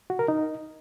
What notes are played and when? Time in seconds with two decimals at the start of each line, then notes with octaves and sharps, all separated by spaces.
0.10 F#4
0.19 A#4
0.28 D#4